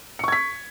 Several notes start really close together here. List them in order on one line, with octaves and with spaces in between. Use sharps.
C#7 C#6 G#6 B6